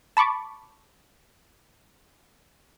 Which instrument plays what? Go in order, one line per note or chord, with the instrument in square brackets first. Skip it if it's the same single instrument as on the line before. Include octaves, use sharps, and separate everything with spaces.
[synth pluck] A5 B5 C#6 D6